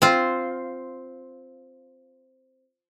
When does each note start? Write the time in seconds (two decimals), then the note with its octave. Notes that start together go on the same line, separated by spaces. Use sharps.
0.02 C4 F4